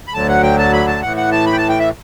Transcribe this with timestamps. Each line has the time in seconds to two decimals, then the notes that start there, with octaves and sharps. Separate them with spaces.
0.08 B5
0.14 D2 D3 F#3 A5
0.28 F#5
0.43 G5
0.58 A5
0.73 B5
0.87 A5
1.02 A2 E3 F#5
1.17 F#5
1.32 A5
1.46 B5
1.53 G5
1.58 A5
1.69 G5
1.79 E5